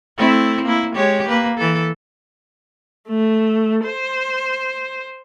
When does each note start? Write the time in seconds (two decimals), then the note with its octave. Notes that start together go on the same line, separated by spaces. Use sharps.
0.17 A3 C4 E4
0.65 A#3 E4
0.95 G#3 G4 C#5
1.29 A#3 B4
1.58 E3 A4
3.08 A3
3.86 C5